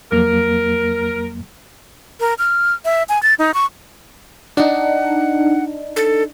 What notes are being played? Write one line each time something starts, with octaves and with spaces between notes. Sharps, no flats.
F2 F#3 A#3 A#4
A#4
F6
E5
G#5
A6
D#4
C#6
D4 D#4 F#5
A4